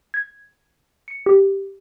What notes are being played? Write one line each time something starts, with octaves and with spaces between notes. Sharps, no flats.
G#6
C#7
G4